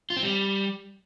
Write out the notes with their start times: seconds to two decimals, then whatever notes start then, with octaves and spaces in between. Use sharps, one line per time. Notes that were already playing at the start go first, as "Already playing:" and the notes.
0.10 F4
0.16 C4
0.23 G3